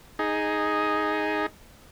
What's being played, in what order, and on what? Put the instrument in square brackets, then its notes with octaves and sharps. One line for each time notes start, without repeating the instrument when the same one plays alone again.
[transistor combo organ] D#4 G#4